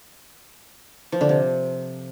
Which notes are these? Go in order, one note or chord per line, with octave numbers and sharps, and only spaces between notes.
F3
D3
C3